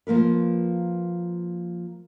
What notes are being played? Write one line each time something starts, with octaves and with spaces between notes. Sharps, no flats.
F3 A#3 A#4 B4